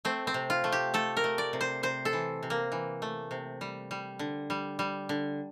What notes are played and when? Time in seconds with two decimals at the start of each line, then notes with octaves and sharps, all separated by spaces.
0.05 A3 C4
0.27 C4
0.34 C3
0.50 F4
0.64 A3
0.72 G4
0.94 A3 A4
1.17 A#4
1.24 A3
1.38 D5
1.53 C3
1.61 C5
1.83 C3 C5
2.05 A4
2.13 E3
2.43 C3
2.50 A#3
2.72 E3
3.02 A3
3.31 C3
3.61 G3
3.91 G3
4.19 D3
4.50 G3
4.79 G3
5.09 D3